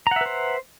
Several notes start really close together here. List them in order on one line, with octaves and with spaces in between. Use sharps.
A#5 F#5 E5 B4 C5